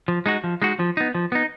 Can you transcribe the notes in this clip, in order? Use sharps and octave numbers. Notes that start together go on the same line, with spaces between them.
F3
G#3 D#4 F#4
F3
G#3 D#4 F#4
F3
B3 D#4
F3
B3 D#4